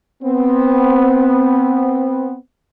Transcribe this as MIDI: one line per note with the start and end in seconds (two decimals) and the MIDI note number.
0.23 2.35 59
0.23 2.35 60